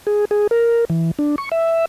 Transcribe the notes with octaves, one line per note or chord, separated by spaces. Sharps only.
G#4
G#4
A#4
E3
D4
C#6
E5